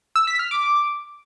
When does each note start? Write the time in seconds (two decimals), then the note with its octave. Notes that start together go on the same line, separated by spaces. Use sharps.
0.16 E6
0.27 B6
0.39 F6
0.51 D6